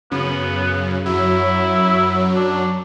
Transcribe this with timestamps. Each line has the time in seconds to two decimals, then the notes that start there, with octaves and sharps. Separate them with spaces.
0.11 F#2 C#3 B3
1.06 F#2 F#3 E4
2.36 D4